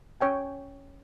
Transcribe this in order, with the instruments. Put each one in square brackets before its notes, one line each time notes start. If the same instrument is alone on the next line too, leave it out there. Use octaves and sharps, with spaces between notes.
[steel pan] C#4 C#5 G5 G#5